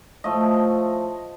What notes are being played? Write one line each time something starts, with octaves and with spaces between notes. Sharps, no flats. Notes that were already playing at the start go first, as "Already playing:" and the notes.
A2 F3 A3 D#5